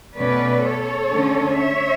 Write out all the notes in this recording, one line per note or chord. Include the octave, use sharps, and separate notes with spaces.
B2 A3 C#4 B4 D5
A4 C#5
D3 A3 C#4
C#5 E5